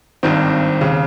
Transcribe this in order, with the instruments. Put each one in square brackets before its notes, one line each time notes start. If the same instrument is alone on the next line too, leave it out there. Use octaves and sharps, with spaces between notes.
[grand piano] G#1 G2 D#3 C4
D#2 C#3